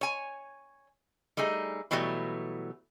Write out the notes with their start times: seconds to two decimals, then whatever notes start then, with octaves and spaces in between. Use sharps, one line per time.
0.01 C#5 G#5
1.37 G3 A3 D#4 G#4
1.91 B2 E3 F#3 G3 A3